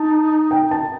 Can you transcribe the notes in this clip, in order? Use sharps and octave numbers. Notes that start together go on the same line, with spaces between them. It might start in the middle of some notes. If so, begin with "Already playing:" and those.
Already playing: D#4 A5
G5
A5